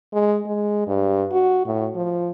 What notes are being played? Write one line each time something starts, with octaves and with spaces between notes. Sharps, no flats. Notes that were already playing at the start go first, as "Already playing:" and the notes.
G#3
G#3
G2
F#4
A2
F3